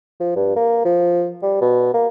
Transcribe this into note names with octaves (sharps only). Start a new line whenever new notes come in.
F3
G2
A#3
F3
G3
B2
A#3